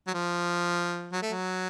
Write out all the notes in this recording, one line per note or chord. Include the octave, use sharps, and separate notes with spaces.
F#3
F3
F#3
A3
F#3